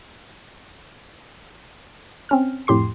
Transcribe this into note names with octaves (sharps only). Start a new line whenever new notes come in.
C4 C#4 F6
F2 A2 G4 C6 C7